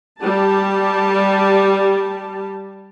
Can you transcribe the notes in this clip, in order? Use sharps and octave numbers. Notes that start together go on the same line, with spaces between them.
G3 G4 A5